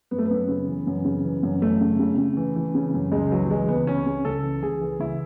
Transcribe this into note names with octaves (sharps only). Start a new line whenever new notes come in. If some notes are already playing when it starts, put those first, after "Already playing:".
F#2 B3
A3
B3
F#2
C#3
E3
F#2
C#3
E3
F#2
F#2 A3
C#3
C#3
C#3
E3
E3
C#3
F#2
C#2 G#3
E3 F#3
F#3
E3 G#3
C#2 B3
C#3 C#4
C#3
C#2 A4
E3
C#2 G#4
E3
C#2 E4